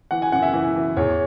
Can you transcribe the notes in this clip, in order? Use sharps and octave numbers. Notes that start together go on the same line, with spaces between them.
E3 F#5
G#5
F#2 F#5
E5
E3
E3
E2 C#5